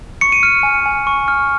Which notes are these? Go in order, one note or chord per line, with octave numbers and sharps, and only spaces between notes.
C#6 C#7
D#7
F6 C#7
G#5
G#5
C#6
F6